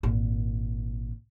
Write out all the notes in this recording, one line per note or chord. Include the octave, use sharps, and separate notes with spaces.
G#1 A#2